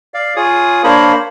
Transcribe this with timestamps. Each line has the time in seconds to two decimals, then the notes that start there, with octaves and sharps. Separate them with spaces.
0.14 D5 F5
0.36 F4 G#4 C#5 D#6
0.84 A#3 D4 A#4 C5 C#5 B5